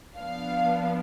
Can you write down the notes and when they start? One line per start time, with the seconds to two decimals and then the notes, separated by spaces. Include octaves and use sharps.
0.15 F3 B3 D4 F5